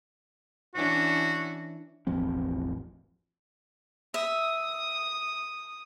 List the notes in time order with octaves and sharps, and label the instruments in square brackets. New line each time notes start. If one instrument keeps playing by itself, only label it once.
[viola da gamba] E3 C#4 D4 [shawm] F#4
[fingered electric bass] E1 A1 F3 C4
[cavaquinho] E5 [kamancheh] D#6